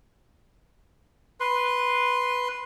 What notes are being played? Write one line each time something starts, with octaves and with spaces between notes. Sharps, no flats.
B4 C6